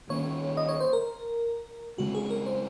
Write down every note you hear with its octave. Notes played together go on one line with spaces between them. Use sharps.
D#3 A#3 C#4 C#5
D#5
C#5
C5
A#4
C#3 G#3 C4 F#4
G#4
A#4
C5